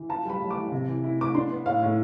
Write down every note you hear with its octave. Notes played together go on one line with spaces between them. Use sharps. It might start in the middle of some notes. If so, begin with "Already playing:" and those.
Already playing: E3
F4 A5
G3 B5
G3
D6
E3
C3
E3
E4
E4 D6
D4 C6
B3
A2 F5
A2